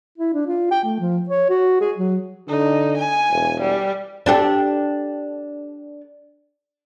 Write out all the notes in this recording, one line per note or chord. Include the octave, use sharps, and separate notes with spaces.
E4
D4
F4
G5
A3
F3
C#5
F#4
G#4
F#3
D3 D#4
G#5
E1
G3
D4 G4 A4